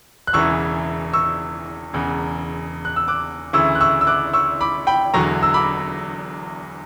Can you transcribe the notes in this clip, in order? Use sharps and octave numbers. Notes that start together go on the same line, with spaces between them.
F#6
E1 E2 C#3 E3 C#6 E6
C#6 E6
E1 E2 C#3
F#6
E6
D6 F#6
D2 C#3 E3 C#6 E6
F#6
C#6 E6
E6
D6 F#6
C#6 E6
B5 D6
G5 B5
E1 E2 D3 F#3 A#5 C#6
E6
B5 D6